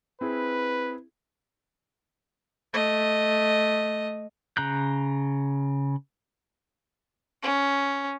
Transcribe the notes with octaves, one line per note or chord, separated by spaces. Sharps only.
C4 E4 G#4 B4
A3 D#5
C#3 A#5 F#6 G6
C#4